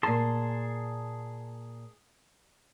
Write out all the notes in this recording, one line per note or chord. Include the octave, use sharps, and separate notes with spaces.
A#2 G#4 G#5 A5 C6